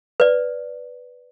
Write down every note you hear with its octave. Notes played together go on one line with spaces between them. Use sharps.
B4 D5